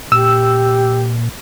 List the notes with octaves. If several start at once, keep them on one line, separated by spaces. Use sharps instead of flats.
A#2 G4 E6